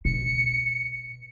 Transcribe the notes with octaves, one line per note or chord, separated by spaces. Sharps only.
B2 C#7